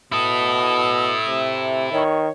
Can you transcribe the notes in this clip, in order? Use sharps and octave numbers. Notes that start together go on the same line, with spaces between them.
B2 E4 A4 D#6
C3
D#3 C#5